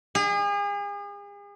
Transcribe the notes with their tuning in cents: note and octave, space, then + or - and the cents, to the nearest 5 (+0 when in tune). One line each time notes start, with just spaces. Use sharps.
G#4 -40